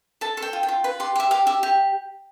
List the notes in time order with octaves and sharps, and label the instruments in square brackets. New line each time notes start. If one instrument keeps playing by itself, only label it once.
[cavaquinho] A4 A5
A4
G5
F4
G5
F4
B4 B5
G4 C6
G4 E5
G4 F5
G4 E5
G4